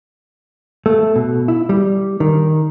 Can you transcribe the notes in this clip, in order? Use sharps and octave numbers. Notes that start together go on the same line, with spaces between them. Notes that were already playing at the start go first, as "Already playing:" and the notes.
A3
B2
E4
G3
D#3